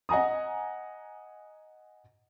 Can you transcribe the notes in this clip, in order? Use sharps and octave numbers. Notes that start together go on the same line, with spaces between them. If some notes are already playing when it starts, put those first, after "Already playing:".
D#5 F#5 G#5 A#5 D#6